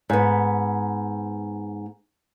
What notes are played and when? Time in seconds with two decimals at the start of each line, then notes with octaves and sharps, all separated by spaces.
0.10 G#2 B3